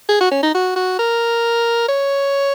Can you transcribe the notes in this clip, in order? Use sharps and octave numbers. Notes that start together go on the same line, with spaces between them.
G#4
F#4
C#4
D#4
F#4
F#4
A#4
C#5